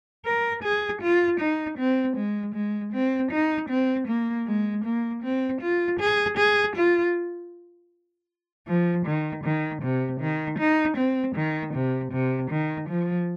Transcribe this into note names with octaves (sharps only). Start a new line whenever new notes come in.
A#4
G#4
F4
D#4
C4
G#3
G#3
C4
D#4
C4
A#3
G#3
A#3
C4
F4
G#4
G#4
F4
F3
D#3
D#3
C3
D#3
D#4
C4
D#3
C3
C3
D#3
F3